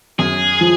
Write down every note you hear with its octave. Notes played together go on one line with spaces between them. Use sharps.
F#2 G#4
F3